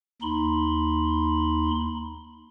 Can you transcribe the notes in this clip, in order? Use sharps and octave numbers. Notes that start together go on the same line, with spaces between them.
D#2 D#4 B5 C6